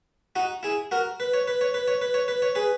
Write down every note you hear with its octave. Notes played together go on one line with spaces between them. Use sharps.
D#4 F#4
E4 G#4
F#4 A#4
B4
C#5
B4
C#5
B4
C#5
B4
C#5
B4
C#5
G#4 B4